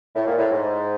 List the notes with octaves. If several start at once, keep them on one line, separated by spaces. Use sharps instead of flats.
A2
A#2
A2
G#2